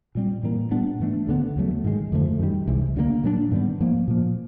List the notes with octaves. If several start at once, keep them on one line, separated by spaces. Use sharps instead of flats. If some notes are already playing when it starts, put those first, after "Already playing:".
A#2 G3 C4
A2 E3 G3 A#3
A#2 G3 B3 D4
G#2 E3 A3 D4
D2 D3 G3 B3
D#2 C#3 F#3 A3
G#2 D#3 G#3
F2 D3 F3 A3
F#2 D#3 G3
C2 C3 E3 G#3
D2 D3 G3 A#3
A#2 F#3 B3 D4
G#2 D#3 G3 B3
G#2 F3 A#3
A#2 F3 A#3